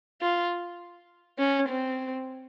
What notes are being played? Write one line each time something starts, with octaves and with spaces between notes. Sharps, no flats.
F4
C#4
C4